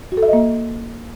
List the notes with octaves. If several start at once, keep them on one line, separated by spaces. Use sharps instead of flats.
F#4
A4
E5
D#5
A#3